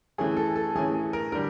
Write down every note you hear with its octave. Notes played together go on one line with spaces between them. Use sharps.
E3 A3 C#4 G#4
A4
A4
E3 A3 C#4 G#4
G#4
A#4
D3 G3 A#4